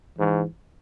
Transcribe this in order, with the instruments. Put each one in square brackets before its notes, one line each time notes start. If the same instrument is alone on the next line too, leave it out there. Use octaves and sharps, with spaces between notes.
[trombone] G#2 [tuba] E3